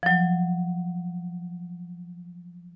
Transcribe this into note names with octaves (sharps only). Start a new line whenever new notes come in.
F3 F#3